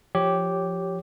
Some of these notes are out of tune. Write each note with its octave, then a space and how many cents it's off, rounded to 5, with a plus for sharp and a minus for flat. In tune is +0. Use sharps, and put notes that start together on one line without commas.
F3 +0 G4 -5 C#5 +0